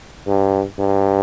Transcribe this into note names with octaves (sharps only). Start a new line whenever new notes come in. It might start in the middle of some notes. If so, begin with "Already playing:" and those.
G2
G2